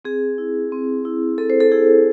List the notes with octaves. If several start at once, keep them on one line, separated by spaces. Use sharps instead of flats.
C4 G#4
E4
C4
E4
C4 A4
C5
A4
E4 G#4